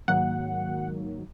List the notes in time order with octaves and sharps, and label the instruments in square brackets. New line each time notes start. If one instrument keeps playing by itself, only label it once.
[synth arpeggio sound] G#2 D#3 F#3 A#3 F#5